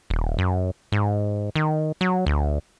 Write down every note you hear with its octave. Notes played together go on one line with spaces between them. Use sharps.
D#1
F#2
G#2
D#3
F#3
D2